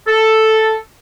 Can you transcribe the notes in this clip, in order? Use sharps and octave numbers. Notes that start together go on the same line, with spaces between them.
A4